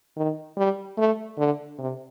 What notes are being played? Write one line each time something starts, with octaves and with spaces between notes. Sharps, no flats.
D#3
G3
A3
D3
C3